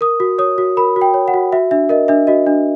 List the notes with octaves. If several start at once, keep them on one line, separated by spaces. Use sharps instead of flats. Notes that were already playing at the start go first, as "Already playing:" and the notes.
A#4 D#6
F#4
C#5 D#6
F#4
A#4 B5
F#4
G5
C#5
F#5
F#4
F#4 E5
D4 E5
A#4 D#5
D4 E5
F#4 D#5
D4